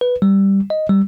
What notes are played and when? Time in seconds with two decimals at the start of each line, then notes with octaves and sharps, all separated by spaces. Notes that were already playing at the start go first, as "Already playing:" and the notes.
0.01 B4
0.22 G3
0.70 D#5
0.90 G3